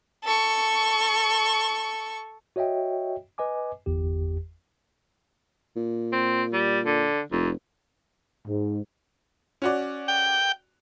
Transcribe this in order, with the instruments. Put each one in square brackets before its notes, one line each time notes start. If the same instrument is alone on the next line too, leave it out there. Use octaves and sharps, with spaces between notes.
[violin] A4 C#6
[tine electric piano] F#4 C#5 D#5 E5 G5
B4 D#5 G#5 D6
G1 E2 G4
[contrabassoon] A#2
[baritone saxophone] C4
G3
D3
[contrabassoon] F1 [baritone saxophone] F2
[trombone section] G#2
[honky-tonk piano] C#4 F#4 D5
[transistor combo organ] G5